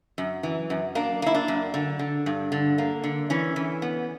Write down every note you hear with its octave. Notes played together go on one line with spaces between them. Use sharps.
F#2
E3
F#2
A#3 D4
A#3 E4
D4
F#2
D3
D3
G2
D3
A#3
D3
E3 C#4
E3
B3